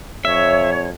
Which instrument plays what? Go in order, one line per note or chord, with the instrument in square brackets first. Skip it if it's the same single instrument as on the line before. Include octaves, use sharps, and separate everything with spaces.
[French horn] F2 [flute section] C#5 [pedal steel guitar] E5